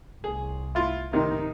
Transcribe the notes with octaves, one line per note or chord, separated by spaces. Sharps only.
C2 G#4
E4 F4
C3 D#3 D#4